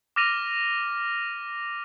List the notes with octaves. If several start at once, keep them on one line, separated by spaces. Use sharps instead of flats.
D6 F6 A#6 D#7 F7